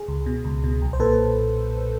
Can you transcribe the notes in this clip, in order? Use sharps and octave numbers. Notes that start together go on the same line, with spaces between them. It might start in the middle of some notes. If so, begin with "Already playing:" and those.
Already playing: G#4
C#2
B2
C#2
B2
B1
C5
A#2 A4 B4